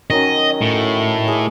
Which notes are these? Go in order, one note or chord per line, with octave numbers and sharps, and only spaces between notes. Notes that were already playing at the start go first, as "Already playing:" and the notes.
D#3 F#3 C#4 D#5
A2
G#4 D6